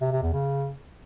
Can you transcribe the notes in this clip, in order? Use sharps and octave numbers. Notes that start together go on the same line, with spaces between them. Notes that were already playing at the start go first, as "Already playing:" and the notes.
C3
C3
E2
C#3